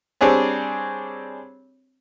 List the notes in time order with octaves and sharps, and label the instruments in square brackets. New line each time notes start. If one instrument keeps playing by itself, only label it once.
[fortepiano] G3 C4 D4 G#4 C#5